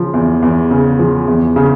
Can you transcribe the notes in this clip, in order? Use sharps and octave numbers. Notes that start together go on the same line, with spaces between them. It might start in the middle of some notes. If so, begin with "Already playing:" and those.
Already playing: C#3 F3
E2
E2
C#3
F3
E2
C#3